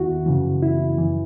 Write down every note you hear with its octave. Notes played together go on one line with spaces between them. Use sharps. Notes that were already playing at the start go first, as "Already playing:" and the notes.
Already playing: E2 D#3 E4 F#4
F#2 C#3 E3
E4
F#2 E3